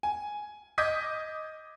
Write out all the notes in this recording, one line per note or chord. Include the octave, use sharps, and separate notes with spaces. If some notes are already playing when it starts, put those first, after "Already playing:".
G#5
D#5 D6 D#6 G6 G#6 B6